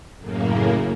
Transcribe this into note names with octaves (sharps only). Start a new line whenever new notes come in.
F#2 A2 C#3 A#3